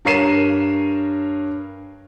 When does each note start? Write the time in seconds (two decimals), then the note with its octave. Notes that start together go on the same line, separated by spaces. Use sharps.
0.05 G2 A#4 C#5 C7 D#7 E7